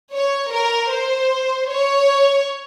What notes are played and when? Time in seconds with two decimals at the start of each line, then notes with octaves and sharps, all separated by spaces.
0.13 C#5
0.52 A#4
0.92 C5
1.71 C#5